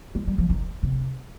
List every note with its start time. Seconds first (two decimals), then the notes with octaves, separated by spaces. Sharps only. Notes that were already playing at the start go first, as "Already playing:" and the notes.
0.15 G#3
0.27 G3
0.38 F3
0.50 D#3
0.83 C3